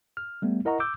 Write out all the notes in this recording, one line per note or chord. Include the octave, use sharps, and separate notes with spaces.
F6
G3 A3 B3
E4 A#4 D#5 F#5 A#5 C#6
D6 E6 G6